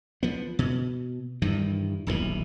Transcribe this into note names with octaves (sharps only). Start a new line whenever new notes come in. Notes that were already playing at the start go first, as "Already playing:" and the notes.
F3 B3
B2
G2 D#3 E3
D#1 B1 A2 E3